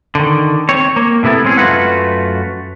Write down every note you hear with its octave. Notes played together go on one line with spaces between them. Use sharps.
D3 D#3
C4 C#5
A#3
A2 C3 B3 E4 A4
G#3 C4 C#4 G#4
F#2 A3 F4 F#4 B4 F#5